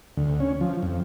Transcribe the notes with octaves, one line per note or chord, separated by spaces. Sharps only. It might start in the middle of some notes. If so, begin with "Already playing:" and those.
D2
C#4
F3
F2